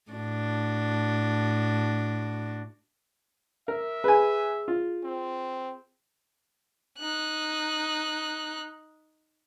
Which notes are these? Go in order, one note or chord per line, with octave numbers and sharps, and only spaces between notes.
A2 D4 F#4
A#4 E5
G#4 B4 G#5
F4
C4
D#4 F#6